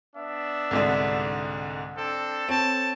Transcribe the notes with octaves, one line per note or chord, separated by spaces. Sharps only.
B3 D4 E5
C2 G#2 D3
C4 D4 A4
C4 A4 C#5 A5